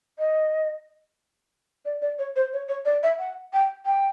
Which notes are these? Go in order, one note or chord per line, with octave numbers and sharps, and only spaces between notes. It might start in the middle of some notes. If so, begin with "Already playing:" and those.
D#5
D5
D5
C#5
C5
C#5
C#5
D5
E5
F#5
G5
G5